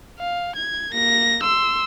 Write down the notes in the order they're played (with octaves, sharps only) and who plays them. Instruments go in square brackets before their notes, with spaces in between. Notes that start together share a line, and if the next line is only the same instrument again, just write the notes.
[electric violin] F5
G#6
A#3 A#6
C6 E6